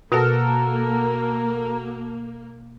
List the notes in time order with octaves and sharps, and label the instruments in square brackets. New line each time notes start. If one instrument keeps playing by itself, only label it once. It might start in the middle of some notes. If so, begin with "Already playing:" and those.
[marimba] B2 [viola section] A#3 [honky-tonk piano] F#4 A4 [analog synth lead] A#4